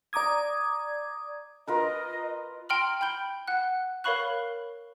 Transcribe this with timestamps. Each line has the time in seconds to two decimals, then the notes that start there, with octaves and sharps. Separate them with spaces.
0.13 D5 A#5 D6 D#6 G#6
1.67 F4 A#4 B4 D#5
2.69 G5 A#5 C6 F6 A#6 F#7
3.01 G5 B5 G6 G7
3.48 F#5 F#6
4.04 A#4 C#5 F5 B5 C#6 F#6